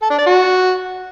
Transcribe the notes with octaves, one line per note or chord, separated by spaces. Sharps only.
A4
D4
D5
F#4